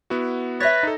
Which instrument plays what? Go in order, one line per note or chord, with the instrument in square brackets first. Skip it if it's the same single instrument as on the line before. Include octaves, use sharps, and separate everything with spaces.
[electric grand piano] B3 E4 F#4
[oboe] B4 [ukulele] C#5 E5 [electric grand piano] A6 A#6
[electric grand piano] D#4 A4